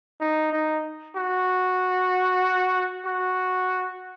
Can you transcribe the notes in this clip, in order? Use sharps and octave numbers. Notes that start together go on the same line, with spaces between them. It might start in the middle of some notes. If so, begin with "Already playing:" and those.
D#4
D#4
F#4
F#4